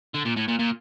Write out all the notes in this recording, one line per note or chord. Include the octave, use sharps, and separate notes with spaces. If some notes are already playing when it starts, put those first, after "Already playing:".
D3
A#2
A2
A#2
A#2